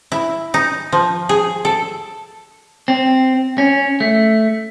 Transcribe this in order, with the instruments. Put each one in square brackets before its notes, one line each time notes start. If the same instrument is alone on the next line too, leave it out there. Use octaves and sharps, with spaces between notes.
[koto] E4
D#4
F3
G#4
A4
[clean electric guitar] C4
C#4
A3